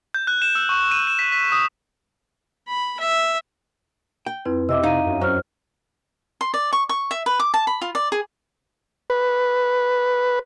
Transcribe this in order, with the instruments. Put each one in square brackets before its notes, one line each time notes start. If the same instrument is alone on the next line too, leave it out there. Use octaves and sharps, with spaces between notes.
[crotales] G6
F#6
E7
E6
C#6
D#7
E7
B6
B6
D#6
[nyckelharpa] B5
E5
[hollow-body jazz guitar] G5
[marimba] F2 C4 E4 [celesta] B4
[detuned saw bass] C3 [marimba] D#5 E5 D6 [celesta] E6
[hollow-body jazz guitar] D#4 [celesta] F5 A#5 D#7
[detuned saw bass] F#2
[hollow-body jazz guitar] F#3 [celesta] C5 F6
[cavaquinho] C6
D5
C#6
C#6
E5
B4
D6
A5
B5
F4
D5
G#4
[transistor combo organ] B4